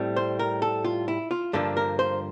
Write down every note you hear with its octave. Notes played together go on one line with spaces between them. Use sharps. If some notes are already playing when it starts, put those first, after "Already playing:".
Already playing: A2 G3 C4
C5
A#4
A4
F4
E4
F4
G2 D3 F3 A#3 D4 A4
A#4
C5